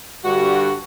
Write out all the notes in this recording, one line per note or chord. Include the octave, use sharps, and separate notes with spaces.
G2 D3 G3 F#4